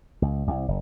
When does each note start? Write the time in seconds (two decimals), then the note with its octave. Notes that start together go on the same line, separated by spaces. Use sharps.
0.22 C#2
0.47 C2
0.68 F#1